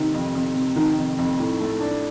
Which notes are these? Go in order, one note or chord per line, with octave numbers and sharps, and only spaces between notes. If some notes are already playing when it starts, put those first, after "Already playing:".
Already playing: C3 D#3
F2
F2
C3
D#3
F2
F2
A2
A3
D4